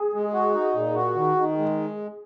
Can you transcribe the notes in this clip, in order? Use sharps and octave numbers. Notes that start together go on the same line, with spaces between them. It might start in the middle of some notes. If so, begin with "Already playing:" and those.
Already playing: G#4
G#3
F#4
D#4
A#2
F#4
D#3
D#3
G#3